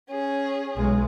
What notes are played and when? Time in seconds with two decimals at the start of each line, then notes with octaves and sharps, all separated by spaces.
0.10 C#4 G#4
0.76 B1 G#3